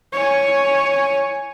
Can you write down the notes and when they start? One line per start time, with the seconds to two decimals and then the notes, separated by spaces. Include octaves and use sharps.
0.13 C#5 G#5